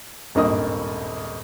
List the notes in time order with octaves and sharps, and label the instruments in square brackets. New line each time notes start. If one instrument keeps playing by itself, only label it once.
[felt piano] D#1 G#1 G2 A#3 D#5 D#6